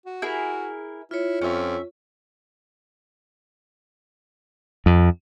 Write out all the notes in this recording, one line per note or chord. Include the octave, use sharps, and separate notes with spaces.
F#4
E4 G#4 A#4
E4 F4 C#5
F2 C#4 E5
F2